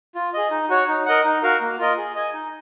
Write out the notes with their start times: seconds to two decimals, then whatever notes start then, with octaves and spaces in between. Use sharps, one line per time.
0.15 F4
0.34 G#4 D#5
0.51 D#4
0.70 F#4 C#5
0.88 D#4
1.06 A#4 D#5 F#5
1.24 D#4
1.43 F#4 A#4 F5
1.61 A#3
1.79 F4 A#4 D#5
1.97 G#4
2.16 D#5 G#5
2.33 D#4